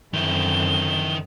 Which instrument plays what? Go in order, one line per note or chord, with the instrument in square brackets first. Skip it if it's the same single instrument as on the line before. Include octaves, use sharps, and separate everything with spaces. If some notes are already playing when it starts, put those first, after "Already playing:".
[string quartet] F#2 D3 C4 [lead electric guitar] D#3 E4 [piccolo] G7